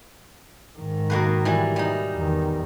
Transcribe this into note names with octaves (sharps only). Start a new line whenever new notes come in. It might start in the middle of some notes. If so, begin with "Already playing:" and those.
G#2 D#3
B2 A#3 B4
E3 G3
G3 D#4
E2 D#3